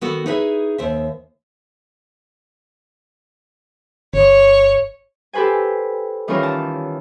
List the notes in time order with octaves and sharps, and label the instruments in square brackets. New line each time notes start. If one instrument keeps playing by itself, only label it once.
[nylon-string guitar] D#3 B3 F#4 A4
D#4 E4 G#4 B4 D5 E5
D#2 C5 E5
[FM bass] G1 [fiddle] C#5
[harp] G4 A4 B4 C5 G#5
D#3 E3 G3 C#4 F4 A#4
A5